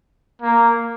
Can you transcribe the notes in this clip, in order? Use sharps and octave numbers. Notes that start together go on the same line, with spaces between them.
A#3